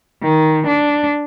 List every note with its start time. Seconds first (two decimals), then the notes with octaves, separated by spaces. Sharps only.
0.23 D#3
0.67 D4